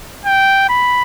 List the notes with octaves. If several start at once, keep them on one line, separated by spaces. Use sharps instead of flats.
G5
B5